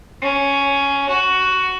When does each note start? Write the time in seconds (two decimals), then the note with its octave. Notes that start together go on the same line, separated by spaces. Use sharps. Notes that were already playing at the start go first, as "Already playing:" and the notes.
0.22 C#4
1.09 F#4